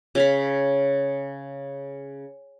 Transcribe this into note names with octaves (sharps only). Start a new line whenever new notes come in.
C#3 F5 B5